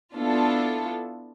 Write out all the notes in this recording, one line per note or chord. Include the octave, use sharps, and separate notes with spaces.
B3 D4 E4 F4 A4